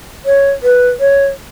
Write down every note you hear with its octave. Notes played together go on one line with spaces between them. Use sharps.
C#5
B4
C#5